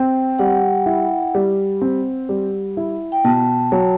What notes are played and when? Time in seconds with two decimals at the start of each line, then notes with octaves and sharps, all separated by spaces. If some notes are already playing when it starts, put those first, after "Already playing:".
Already playing: C4 G5
0.39 G3 F#5
0.86 E4
1.35 G3
1.82 C4
2.29 G3
2.77 E4
3.12 G5
3.24 B2 A5
3.72 F#3